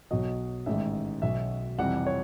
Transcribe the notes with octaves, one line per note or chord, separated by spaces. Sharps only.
B1 B2 F#3 D#5
A1 G#2 D#3 E5
B1 B2 F#3 E5
F2 C3 E3 G3 F#5
C#5